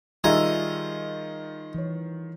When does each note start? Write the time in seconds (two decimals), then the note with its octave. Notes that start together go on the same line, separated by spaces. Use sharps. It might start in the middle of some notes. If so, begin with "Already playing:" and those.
0.24 D#3 G3 F4 G#4 D#5 E5 G#5 A#5
1.75 E3 C#5